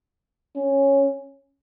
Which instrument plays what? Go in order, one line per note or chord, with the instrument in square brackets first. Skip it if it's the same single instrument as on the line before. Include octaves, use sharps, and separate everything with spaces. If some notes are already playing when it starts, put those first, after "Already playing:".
[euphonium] C#4